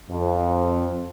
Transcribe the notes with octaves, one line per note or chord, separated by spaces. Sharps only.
F2